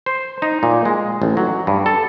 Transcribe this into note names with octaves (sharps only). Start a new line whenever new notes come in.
C5
D#4
A#2
G#3
A1
F#3
G2
A4